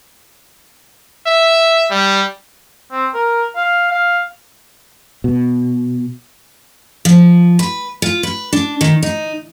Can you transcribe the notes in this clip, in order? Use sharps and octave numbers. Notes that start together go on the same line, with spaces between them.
E5
G3
C4
A#4
F5
F5
B2
F3
B4
F4
B4
D4
D#3
D#4